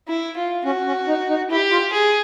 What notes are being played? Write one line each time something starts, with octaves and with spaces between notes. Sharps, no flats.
E4
F4
C#4 F#4
C#4
D#4
D#4
E4 G4
F4
G#4